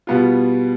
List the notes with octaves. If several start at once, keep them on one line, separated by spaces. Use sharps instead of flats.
B2 G3 B3 F4